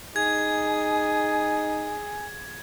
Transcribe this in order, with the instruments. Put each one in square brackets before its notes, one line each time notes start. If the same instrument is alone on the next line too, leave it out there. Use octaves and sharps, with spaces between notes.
[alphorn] D#4 [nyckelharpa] G#4 [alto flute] G#5 [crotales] G#6